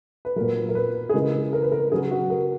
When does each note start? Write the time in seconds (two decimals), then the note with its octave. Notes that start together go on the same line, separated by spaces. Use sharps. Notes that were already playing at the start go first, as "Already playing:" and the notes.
0.25 B4
0.36 A#2 F#3 A#4
0.69 A#4
0.75 B4
1.09 G#4
1.14 C#3 E3 G#3 A#4
1.53 A#4
1.62 B4
1.72 A#4
1.92 C#3 F#3 G#4
2.11 F#4
2.30 A#4